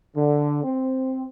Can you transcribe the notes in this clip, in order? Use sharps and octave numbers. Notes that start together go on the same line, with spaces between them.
D3
C4